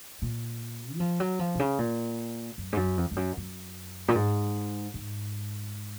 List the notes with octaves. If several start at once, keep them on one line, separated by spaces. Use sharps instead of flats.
A#2
F#3
F3
F#3
F3
B2
C#3
A#2
F#2
G#2
F#2
F2
F2
F#2
F#2
A#2
G#2
G#2